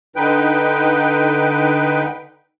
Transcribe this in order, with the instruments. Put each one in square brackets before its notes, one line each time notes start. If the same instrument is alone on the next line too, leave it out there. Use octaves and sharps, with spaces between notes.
[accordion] D3 D#4 B4 G5